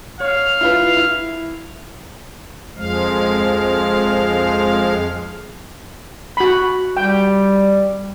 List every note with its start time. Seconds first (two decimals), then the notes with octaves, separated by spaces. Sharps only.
0.20 C#5 F5
0.61 E4 F4 B4
0.97 E4
2.77 F2 F3 G#3 F5
6.37 F#4 B5
6.97 G3 G5